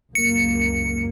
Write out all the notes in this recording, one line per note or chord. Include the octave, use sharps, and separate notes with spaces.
C#2 F#2 A#3 C#7